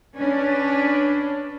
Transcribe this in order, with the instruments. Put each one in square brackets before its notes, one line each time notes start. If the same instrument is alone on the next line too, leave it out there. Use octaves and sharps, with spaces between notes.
[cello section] C#4 D4 B4